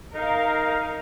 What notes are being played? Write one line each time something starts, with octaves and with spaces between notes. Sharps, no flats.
D#4 A#4 F5